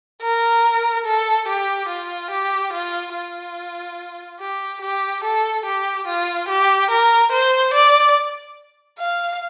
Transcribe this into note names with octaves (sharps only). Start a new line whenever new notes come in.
A#4
A4
G4
F4
G4
F4
F4
G4
G4
A4
G4
F4
G4
A#4
C5
D5
F5